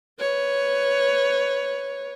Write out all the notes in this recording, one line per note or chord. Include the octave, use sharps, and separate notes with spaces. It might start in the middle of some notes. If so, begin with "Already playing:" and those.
B4 C#5